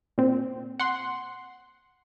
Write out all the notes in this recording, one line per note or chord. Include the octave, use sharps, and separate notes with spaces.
A#2 C4
F#5 C6